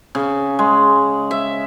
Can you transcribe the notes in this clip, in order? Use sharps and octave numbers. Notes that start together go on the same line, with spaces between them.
C#3
G#3
E5